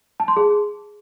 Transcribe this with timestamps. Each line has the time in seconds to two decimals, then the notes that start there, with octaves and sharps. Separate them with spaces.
0.20 A5
0.28 C6
0.36 G#4